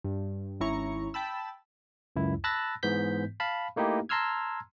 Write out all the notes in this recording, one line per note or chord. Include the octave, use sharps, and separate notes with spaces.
G2
G#1 C#4 E4 A#5 C#6
G5 A5 B5 E6
C#2 F#2 E4
A5 B5 E6 F#6 A6 A#6
G#2 E3 B3 G6 B6
F5 A5 B5
A3 A#3 D#4 E4 G4
A5 A#5 C6 E6 F6 G#6